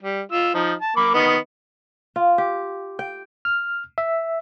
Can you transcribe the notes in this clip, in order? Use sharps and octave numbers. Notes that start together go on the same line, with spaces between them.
G3
F4 E6
F3 D#4
A5
A#3 B5 D6
D#3 B3 D#5
F4
G4
G5
F6
E5